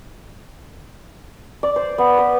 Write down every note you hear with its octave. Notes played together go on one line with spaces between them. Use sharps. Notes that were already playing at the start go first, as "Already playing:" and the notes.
D5
C5
B3
B4